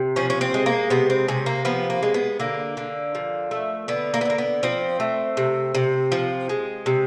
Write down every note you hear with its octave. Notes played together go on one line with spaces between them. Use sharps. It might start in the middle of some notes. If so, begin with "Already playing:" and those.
Already playing: C3
F3 C#4
C#4
C4
G#3
A#3
C3 B3
C4
C3 C#4
A#3
F3 B3
A#3
G#3
B3
D3 A#3
D3
F3
A3
D3 B3
A#3
B3
D3 A#3
B3
F3 C4
A3
C3
C3
F3
G#3
C3